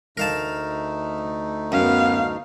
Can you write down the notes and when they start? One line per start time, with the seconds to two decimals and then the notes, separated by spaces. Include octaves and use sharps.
0.17 D2 A3 D#4 A#4 F5 A5
1.72 F#2 B3 F5